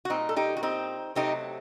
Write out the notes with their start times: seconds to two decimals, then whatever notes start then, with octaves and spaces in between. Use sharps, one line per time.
0.05 F#4
0.10 A#2 G3 C4 D#4
0.29 A4
0.36 D#4 G4
0.57 F#4
0.63 C4 D#4
1.15 C3 F#3 A3 C4 D#4 G4